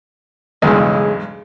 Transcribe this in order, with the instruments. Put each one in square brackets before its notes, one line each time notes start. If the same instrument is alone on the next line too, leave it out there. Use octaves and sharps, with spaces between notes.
[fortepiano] B1 E2 G2 [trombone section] C#3 G#3